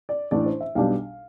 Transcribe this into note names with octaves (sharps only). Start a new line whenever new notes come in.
D5
A1 A2 E3 A3 D4 D5
C5
E5
B1 B2 G3 D4 F5